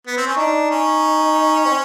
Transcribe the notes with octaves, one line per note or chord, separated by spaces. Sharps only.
B3
C4
C#4
D4 D#4
C#4
C4